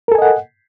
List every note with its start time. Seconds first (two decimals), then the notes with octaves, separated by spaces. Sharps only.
0.08 A#4
0.12 A4
0.15 G#5
0.18 D#5
0.22 F#5